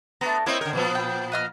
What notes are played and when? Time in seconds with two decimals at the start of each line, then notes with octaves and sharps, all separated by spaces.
0.21 A3 B3 D4 A#5
0.46 A#3 C4 E4 C#5 D#5 G5
0.61 D3 A#4
0.73 A#2 F3 B3
0.95 G5
1.32 B4 D#5 F6